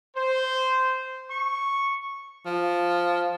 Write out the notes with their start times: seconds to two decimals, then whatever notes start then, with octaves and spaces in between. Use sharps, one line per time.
0.16 C5
1.30 C#6
2.46 F3